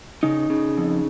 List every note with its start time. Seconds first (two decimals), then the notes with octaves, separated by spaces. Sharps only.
0.23 C#3 D#4
0.50 C#3
0.78 F2